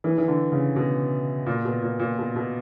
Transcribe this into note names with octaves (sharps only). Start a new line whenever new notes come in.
E3
E3
D3
C#3
B2
A#2
B2
A#2
A#2
B2
B2